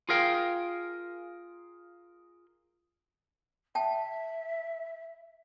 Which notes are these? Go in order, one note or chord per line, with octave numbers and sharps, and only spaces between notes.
F4 G#4 A#4 F5 G5
E5 G5 A5